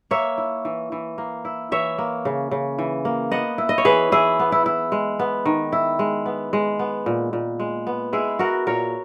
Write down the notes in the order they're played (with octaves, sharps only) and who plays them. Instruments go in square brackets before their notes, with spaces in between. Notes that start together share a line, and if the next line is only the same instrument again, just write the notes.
[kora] A#3 C#5 E5
E4
E3
E3
A#3
E4
E3 C#5 E5
A#3
C#3
C#3
E3
A#3
B3 D#5 F#5
E4
D#5
C#5
E3 G#4 B4
E3 E4 G#4
B3
E4
E4
G#3
B3
D#3
E4
G#3
B3
G#3
B3
A#2
A#2
G#3
B3
G#3 E4 G#4
B3 F#4 A#4
A#2 A#4 C#5